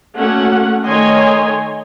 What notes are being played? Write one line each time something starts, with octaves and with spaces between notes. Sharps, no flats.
A3 A#3 C#4 F#4 F#5
D#3 A3 C#5 D#5 G#5 C6